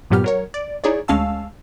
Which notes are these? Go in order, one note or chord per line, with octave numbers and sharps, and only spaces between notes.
G2 A#2 F#3 B3 G4 F6
F#3 A#4 C#5
D5
D#4 E4 G#4 C#5 D5
D2 G#3 C#4 F5 A5 E6